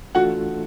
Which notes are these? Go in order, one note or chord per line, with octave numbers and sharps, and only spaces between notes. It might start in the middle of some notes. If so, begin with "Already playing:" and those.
E3 A3 D4 F4 F#4 A4 F#5